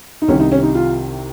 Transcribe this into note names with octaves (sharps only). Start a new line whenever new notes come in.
D#4
C2 C3 D#3 C#4
D#4
C#4
D#4
F4